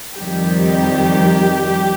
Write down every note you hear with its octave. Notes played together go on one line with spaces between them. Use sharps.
F2 D#3 G3 G4